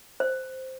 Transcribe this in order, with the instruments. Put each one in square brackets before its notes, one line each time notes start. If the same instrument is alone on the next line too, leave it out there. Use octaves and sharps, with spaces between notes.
[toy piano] C5